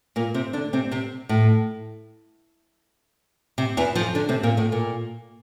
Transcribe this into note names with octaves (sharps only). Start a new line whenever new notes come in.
A#2 A#3
C3 C4
D3 D4
C3 C4
C3 C4
A2
C3
E2 E3
F2 F3
D3 D4
C3 C4
A#2 A#3
A2 A3
A#2 A#3